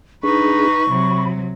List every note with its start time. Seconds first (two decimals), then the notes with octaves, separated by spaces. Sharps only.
0.23 D4 D#4 G#4 B4 C#6
0.90 C3 F#3 B5